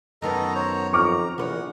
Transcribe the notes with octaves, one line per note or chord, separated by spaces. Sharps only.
F#2 D#3 B3 A4 D#5 A#5
C5 C#5 A#5
F2 A#5 C#6 D6 F6
A#1 E3 B4 C#5 F#5